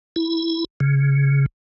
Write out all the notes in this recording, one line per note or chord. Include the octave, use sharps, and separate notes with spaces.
E4
C#3